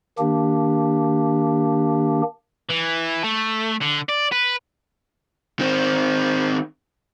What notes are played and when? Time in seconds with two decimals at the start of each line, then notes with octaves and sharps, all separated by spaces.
0.19 D#3 A#3 D4 G4
2.70 E3
3.24 A3
3.81 D3
4.09 D5
4.32 B4
5.59 D#3 C4